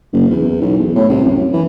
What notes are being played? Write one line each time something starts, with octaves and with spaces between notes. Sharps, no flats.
F#1
E2
B1
E2
A2
C2
F#2
E3